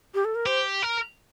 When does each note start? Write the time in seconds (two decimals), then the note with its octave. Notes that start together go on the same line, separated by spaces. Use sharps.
0.14 G4
0.25 A4
0.35 A#4
0.46 G4 C5
0.83 A#4